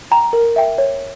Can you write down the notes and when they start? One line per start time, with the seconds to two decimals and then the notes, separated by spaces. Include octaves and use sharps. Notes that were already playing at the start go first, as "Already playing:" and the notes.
0.11 G5 A#5
0.33 A#4
0.56 E5 G5
0.78 C#5